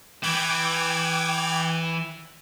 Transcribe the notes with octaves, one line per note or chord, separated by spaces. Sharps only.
E3 G5 D6 G#6